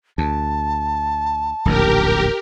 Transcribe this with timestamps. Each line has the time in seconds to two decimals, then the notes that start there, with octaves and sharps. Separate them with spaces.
0.18 D2 A5
1.65 D1 A#1 D#2 G4 A#4